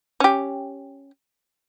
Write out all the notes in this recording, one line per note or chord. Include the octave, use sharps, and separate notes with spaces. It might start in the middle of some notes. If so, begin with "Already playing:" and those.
C#4 G4